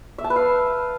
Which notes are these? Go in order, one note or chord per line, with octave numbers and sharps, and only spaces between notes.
E5
A5
B4
F5